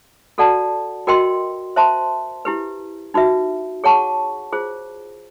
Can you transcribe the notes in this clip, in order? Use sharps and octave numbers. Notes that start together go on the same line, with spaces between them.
F#4 A4 D5 F#5 A5
F#4 A#4 D#5 G5 C6
C5 E5 A5 C6
E4 G4 B4
D#4 F#4 B4 E5
G#4 C#5 F#5 A5 C#6
F4 G#4 C5